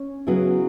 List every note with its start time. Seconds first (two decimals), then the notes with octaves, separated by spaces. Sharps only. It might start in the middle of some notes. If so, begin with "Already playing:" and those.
Already playing: C#4
0.27 C#3 F#3 B3 E4 G#4